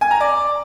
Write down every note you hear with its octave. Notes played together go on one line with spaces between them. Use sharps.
G#5
A#5
D5